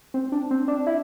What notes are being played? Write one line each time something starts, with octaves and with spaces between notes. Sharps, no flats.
C4
D4
C4
D4
E4